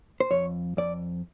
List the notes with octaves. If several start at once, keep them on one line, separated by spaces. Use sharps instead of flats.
C5
F2 C#5
F2 D5